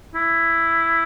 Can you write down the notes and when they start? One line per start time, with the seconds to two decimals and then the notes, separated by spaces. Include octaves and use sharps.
0.15 E4